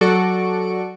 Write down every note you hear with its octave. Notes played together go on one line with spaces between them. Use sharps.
F#3 F#4 A4 D5 C#6 D7